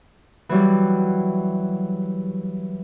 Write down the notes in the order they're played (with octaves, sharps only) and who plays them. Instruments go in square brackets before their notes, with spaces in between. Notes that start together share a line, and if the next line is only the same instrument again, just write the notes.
[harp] E3 F#3 G3